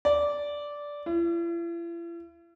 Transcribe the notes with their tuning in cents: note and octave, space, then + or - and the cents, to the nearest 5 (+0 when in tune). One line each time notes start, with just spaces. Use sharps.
D5 -10
E4 +45